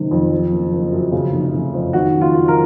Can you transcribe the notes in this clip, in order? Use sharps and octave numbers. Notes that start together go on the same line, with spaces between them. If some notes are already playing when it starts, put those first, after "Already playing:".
Already playing: F#1 C3 D#3
F2
F3
F#1
F#1
F#2
C#3
F1
F1
F2
D#3 F#4
F#1
F4
F#3
A#4